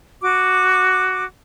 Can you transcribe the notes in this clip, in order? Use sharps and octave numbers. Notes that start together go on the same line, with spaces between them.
F#4 D6